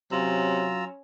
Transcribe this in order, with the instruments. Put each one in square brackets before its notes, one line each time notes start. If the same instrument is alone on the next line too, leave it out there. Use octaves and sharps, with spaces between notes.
[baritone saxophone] C3 [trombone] F#3 [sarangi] C#4 [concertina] F4 A#5 E6